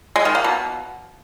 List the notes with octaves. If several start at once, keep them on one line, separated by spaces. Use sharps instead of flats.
G#3
D#3
A#3
B2